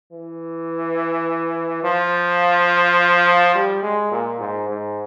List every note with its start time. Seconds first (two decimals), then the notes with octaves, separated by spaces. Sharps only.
0.12 E3
1.83 F3
3.55 G3
3.83 G#3
4.11 A#2
4.40 G#2
4.69 G#2